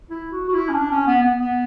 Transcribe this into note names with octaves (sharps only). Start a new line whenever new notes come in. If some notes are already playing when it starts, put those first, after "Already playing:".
E4
F#4
F#4
E4
C#4
D4
C#4
B3
B3
B3